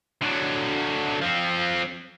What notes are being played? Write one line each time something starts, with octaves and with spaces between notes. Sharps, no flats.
D3 F#3
F3 C4